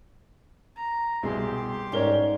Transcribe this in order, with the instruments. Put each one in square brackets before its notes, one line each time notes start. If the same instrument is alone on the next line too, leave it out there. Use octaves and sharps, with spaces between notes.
[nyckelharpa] A#5
[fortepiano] C2 [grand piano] B2 G#4 [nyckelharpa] G4 C6
[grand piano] G#2 G7 [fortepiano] C#4 A#4 C#5 [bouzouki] D5